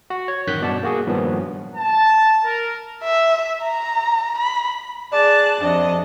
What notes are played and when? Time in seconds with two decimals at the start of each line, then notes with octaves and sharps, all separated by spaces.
0.10 F#4
0.28 C#5
0.47 A1 F#2 D#3 F#6 G6 B6
0.61 G2 B2 D5 F#5 A5
0.83 A#3 F#4 G#4
1.06 G2 A#2 D#3 F3 F#3 B3
1.75 A5
2.44 A#4
3.04 E5
3.63 A#5
4.38 B5
5.13 G#4 D5 A5 F#6
5.62 F2 C3 D4 D#5